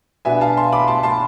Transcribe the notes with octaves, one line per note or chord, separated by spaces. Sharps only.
B2 B3 D4 E5 G#5
F5 A5
A5 C6
B5 D6
A5 C6
A5 C6